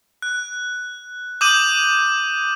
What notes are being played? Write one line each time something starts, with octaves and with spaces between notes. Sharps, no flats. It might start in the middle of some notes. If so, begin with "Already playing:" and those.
F#6
D6 D#6 G6 D#7 F#7